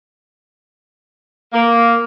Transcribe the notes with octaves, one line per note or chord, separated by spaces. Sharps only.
A#3